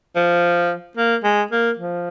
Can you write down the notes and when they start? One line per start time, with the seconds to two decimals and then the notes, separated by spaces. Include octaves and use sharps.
0.16 F3
0.97 A#3
1.24 G#3
1.52 A#3
1.79 F3